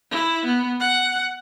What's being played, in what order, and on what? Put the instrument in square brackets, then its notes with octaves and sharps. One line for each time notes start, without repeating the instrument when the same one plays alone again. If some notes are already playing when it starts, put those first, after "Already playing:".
[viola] E4
B3
F#5